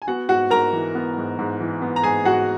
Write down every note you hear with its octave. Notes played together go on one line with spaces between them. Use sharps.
G#5
B3 F#4 F#5
G#2 F#4 F#5
G#2 A#4 A#5
E3
B3
G#2
G#2
E3
B3
A#5
G#2 G#4 G#5
G#2 F#4 F#5